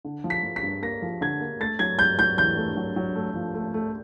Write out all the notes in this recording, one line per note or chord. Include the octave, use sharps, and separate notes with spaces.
D3
F3
B6
F3
B6
G2
A#3 A#6
F3
D3 G#6
A#3
A3 A6
F#3 G#6
F#3 G6
F#3 G6
E2 G6
A3
F#3
F#3
A3
F3
A3
A3